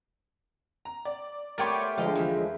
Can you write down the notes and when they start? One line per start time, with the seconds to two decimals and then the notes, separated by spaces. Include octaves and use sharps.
0.85 A#5
1.05 D5
1.58 A3 B3 G4 A#4 C#5 D5 G5 C6
1.98 D3 F3 G#3 G4 D#5 F5
2.15 E2